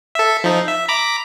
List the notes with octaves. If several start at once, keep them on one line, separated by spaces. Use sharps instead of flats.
A4 E5
F3 D#4
E5
A#5 B5 D6